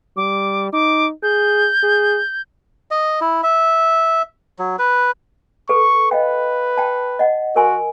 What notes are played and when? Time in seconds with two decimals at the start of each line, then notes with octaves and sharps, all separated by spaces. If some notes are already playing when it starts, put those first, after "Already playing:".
0.17 G3 D6
0.73 D#4 D6
1.23 G#4 G6
1.83 G#4
2.91 D#5
3.21 E4
3.43 E5
4.59 F#3
4.79 B4
5.69 A4 B4 C#6
6.11 B4 D#5 F5 G5
6.77 G5 A5
7.19 D#5 F#5
7.56 F#4 A#4 G#5 C6